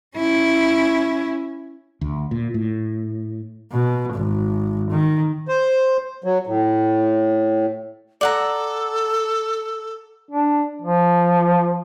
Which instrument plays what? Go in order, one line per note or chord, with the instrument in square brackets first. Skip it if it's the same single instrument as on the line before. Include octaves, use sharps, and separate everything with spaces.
[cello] C#4 E4
[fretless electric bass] D2
A#2
A2
[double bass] B2
G#1
D#3
[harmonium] C5
F#3
A2
[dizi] A4 [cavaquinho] D5 F#5 A#5
[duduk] D4
F3